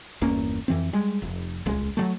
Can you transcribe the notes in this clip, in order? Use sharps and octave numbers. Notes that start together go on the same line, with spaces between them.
G1 E2 A#3 C#4
F2 E3 C4
G3 G#3
F1
D#1 C#2 G#3
F#3 G3 A3